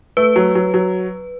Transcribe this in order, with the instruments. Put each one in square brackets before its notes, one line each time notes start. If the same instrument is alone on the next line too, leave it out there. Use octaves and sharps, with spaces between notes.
[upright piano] A3 [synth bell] B4
[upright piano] F#3
F#3
F#3